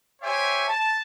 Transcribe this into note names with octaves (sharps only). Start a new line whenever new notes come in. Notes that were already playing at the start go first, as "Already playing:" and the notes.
G4 C5 C#5 E5 G5 G#5
A5